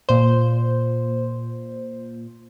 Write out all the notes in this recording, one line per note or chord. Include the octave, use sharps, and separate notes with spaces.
A#2 C5